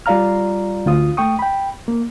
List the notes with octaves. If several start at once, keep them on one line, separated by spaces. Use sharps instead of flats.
G3 F4 D5 F5 A#5 F6
D2 F4 D#6
A3 G5 C#6 D#6
G5 B5
A#3